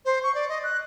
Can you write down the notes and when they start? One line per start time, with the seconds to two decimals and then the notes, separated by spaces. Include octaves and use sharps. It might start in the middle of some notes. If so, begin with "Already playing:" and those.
0.05 C5
0.23 C#6
0.35 D5
0.49 D#5
0.64 F#6